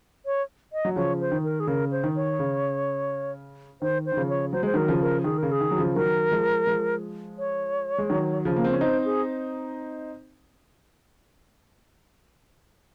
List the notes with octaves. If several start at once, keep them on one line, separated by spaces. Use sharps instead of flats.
C#5
D#5
F#3
C#3 F3 C#5
C5
D#3
A#4
G#4
C#3 A#4
C5
D#3
C#5
C#3
D#3 C5
C5
D#3
C#3 F3
C#5
F#3 C5
G#3 C5
D#3 F#3 A#4
C#3 F3
A#4
D#3 G#4
C#3 A#4
G#4
D#3
F#3
C#3 F3
D#3 F#3 A#4
F3 G#3
F3 G#3
C#5
G#3
D#3 F#3
C#3 F3
A#3
C4
C#4
C4 D#4 C5
G#4